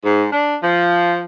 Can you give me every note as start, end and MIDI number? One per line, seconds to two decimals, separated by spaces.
0.03 0.24 44
0.30 0.56 62
0.62 1.23 53